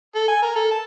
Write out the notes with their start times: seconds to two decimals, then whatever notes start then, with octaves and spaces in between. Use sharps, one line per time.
0.15 A4
0.28 G#5
0.43 A#4
0.56 A4
0.71 A5